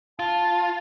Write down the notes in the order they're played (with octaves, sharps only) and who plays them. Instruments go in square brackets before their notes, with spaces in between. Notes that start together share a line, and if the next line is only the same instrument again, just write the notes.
[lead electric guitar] F4 [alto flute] A5